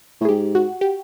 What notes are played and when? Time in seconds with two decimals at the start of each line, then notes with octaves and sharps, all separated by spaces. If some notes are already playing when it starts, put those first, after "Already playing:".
0.21 A2
0.25 G#4
0.29 G#2 G4
0.55 F#4
0.81 G4